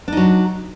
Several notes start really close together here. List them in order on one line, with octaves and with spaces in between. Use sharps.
D4 D#4 F#3